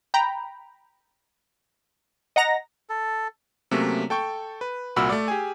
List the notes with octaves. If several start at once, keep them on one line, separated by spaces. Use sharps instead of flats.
G5 A#5 B5
D#5 F#5 A#5 A#6
A4
C3 F#3 A3 A#3 C#4
A4 G5 C#6 G6
B4
C2 A#2 F#4 B5 E6 F6
A3 D5
G4 G#4 G#5